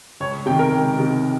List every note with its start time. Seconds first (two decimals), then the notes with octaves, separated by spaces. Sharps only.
0.20 C#2 C#5
0.46 C3 G5
0.50 D#3
0.59 A#4
0.72 C#2
0.97 C3 D#3